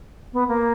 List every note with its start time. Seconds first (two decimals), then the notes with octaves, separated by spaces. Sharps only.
0.33 B3
0.48 A#3